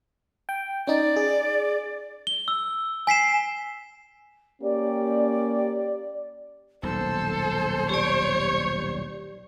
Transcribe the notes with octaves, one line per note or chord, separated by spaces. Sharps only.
G5
C#4 D#4 D5
G#4
G7
E6
G#5 B6 C7 E7
A#3 C#4 G4 D5
D#1 B1 A4 C5
G4 C#5 D5